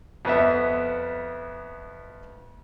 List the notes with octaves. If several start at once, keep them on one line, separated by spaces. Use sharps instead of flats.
F2 B3 E5